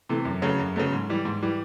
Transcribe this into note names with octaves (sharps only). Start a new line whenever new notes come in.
C3 E3 A3
F#2
C#3 F#3 A3
F#2
C#3 F#3 A3
G#2
E3 G3
G#2
E3 G3